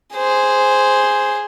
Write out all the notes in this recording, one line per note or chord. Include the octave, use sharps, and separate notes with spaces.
G#4 C5